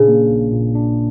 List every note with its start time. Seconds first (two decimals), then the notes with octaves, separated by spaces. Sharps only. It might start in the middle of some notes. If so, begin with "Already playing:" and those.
Already playing: A#2 C#3 D4
0.08 A#3
0.30 A#1
0.52 A#2
0.75 D4